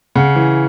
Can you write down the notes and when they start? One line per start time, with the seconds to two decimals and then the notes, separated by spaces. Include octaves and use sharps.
0.16 C#3 F#5
0.36 E3